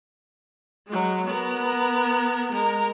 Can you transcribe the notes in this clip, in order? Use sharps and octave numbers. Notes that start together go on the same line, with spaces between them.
F#3 G#3
B3 A#4
G#3 A#4